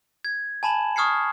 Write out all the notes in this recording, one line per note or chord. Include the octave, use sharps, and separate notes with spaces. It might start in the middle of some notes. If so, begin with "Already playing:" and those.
G#6
G#5 A5 B5 E7 F#7
C#6 D#6 F6 G#6 C7 C#7